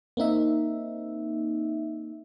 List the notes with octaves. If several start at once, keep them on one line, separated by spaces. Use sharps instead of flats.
A#3 C4 D#4 E5